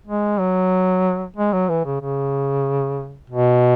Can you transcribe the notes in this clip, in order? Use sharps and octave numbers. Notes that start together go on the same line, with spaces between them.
G#3
F#3
G#3
F#3
E3
C#3
C#3
B2